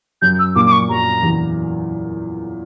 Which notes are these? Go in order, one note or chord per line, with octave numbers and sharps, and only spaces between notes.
F#2 F#3 G6
E6
A#2 A#3 D6
D6
C#6
F#2 F#3 A#5
E2 E3